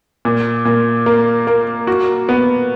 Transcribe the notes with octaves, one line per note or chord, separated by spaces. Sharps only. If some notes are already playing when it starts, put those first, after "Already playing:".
A#2
A#2
A#3
A#3
F#4
B3